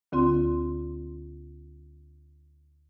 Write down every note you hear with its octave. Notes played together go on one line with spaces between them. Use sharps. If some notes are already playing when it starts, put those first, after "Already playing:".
D2 D3 C4 F4 C6